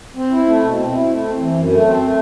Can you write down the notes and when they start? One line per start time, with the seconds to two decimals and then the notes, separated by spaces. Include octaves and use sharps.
0.16 C4
0.31 E4
0.46 A3
0.62 B2
0.77 C4
0.92 E4
1.08 A3
1.23 C4
1.38 E3
1.53 F#2
1.69 A3
1.84 C4
1.99 A3